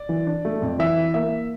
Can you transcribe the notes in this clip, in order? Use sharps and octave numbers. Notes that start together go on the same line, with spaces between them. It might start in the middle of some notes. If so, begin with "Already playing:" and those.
Already playing: D5
E3
D4
A3
F2
E3 E5
E4
A#3 E5